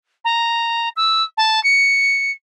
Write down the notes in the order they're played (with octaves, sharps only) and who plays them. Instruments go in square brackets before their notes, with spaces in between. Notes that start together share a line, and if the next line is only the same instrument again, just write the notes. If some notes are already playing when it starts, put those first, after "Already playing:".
[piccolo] A#5
E6
A5
C#7